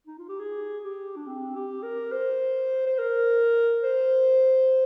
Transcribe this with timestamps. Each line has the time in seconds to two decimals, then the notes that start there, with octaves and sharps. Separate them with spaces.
0.07 D#4
0.19 F4
0.29 G4
0.40 G#4
0.84 G4
1.16 D4
1.27 C4
1.55 G4
1.83 A#4
2.12 C5
2.87 C5
2.99 A#4
3.84 C5